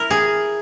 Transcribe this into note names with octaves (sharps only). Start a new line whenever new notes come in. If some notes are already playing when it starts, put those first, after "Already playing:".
Already playing: E4 A#4
G#4